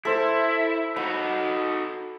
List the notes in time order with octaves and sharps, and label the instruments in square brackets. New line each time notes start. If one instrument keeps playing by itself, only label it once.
[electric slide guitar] E4 [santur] A4 C5
[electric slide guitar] D#4 F#4 [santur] B5